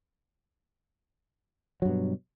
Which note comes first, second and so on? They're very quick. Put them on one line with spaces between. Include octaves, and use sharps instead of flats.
F#3 G2 B2